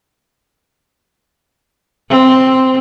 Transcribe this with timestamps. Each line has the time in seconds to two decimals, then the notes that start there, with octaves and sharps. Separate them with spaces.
2.10 C4